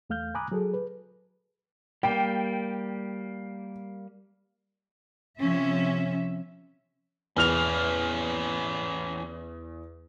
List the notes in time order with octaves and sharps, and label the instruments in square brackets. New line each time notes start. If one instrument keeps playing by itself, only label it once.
[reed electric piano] E2 A3 F5 F6 G6
G#5 A#5 B5 D6 D#6 F#6
F#3 G#4 A4
B4
[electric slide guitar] G3 A#3 [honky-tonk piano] G5
[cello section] C3 F3 C#4 E5
[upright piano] E2 F6 F7 [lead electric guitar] E3 C#4